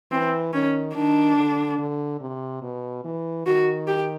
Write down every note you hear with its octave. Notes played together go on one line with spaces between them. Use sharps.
E3 C4
D#3 C#4
D#3 D4
D3
D3
C3
B2
E3
D#3 F#4
G4